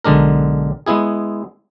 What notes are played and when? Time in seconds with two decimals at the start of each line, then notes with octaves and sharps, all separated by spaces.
0.05 B1 D3 G#3 D4 A#4
0.86 G#3 B3 E4 G#4